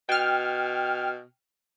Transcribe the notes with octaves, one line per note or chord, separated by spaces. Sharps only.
B2 G5 F6